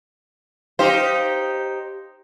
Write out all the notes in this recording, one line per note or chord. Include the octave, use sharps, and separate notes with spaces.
D#4 G4 C5 F5